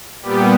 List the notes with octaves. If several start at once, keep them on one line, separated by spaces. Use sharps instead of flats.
A#2 G3 B3 G4